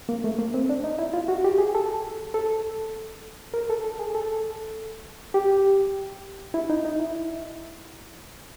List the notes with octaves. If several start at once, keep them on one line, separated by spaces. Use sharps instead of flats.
A#3
A3
A#3
C4
D4
D#4
E4
F4
F#4
G4
G#4
A4
A4
A#4
A4
A4
G#4
A4
G4
E4
D#4
D#4
E4